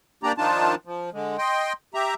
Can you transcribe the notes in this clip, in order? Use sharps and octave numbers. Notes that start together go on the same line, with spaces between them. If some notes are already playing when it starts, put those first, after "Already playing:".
A#3 D4 G4 D5 A#5
D#3 F3 D4 D#4 F4 A5
F3
D3 G#3
D#5 G5 C6
G4 E5 A#5